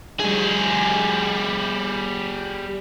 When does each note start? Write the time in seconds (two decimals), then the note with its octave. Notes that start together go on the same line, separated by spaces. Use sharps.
0.20 G3 G#4